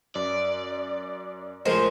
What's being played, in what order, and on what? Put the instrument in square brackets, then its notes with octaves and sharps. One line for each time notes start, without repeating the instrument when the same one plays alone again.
[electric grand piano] F#2 [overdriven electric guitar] D5
[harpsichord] A2 F3 G#3 [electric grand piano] G#4 A#4 D#5 [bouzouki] C5